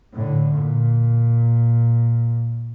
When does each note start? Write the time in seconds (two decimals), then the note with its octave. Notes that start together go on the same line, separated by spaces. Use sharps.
0.13 A2 D3
0.53 A#2